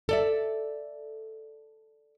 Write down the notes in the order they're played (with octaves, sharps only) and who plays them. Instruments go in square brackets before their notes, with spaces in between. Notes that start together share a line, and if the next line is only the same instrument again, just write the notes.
[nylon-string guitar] A4 D5 E5